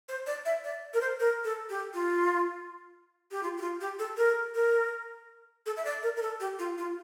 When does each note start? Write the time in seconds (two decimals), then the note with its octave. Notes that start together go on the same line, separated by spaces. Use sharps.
0.09 C5
0.26 D5
0.45 E5
0.64 D5
0.94 A#4
1.01 C5
1.20 A#4
1.44 A4
1.69 G4
1.94 F4
3.31 G4
3.43 F4
3.57 G4
3.61 F4
3.81 G4
3.99 A4
4.17 A#4
4.55 A#4
5.66 A4
5.77 E5
5.85 D5
6.03 A#4
6.17 A#4
6.22 A4
6.40 G4
6.59 F4
6.78 F4